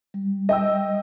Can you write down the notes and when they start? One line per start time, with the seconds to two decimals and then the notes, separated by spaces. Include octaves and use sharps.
0.14 G3
0.49 D#5 G5 E6